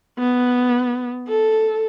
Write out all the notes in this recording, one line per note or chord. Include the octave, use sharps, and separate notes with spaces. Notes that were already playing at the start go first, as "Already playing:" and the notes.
B3
A4